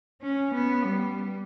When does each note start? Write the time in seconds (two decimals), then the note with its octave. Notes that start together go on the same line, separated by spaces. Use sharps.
0.22 C#4
0.55 B3
0.86 G3